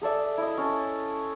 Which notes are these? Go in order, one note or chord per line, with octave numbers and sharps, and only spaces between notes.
G#4 A4 D5 E5
E4 D#5
C#4 A4